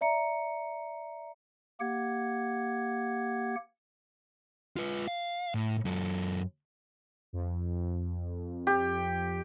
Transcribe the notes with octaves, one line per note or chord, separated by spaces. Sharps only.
D5 E5 A#5 C#7
A#3 G4 F#5 G#6
F4 B4
F5
A2
F#2 A4
F2
G4